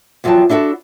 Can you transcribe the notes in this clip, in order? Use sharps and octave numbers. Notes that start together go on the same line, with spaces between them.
E2 F3 F#3 F5 G5 A5
D4 E4 F#4 G4 A4